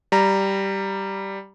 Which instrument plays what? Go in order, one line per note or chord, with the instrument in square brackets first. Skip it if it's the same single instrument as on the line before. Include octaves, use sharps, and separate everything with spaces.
[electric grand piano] G3 A#5